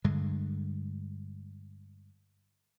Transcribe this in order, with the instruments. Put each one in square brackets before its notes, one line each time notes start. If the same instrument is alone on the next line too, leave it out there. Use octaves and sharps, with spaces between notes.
[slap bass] G2 D3 G#3